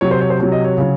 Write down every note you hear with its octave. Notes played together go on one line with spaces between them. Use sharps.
C3 F#3 C#5
C5
C#5
C5
C3 F#3 C#5
D#5
C#5
C#3 F#3